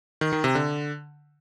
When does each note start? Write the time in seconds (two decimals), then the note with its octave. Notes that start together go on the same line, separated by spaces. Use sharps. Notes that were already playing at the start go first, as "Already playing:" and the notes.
0.21 D#3
0.33 D#3
0.44 C3
0.55 D3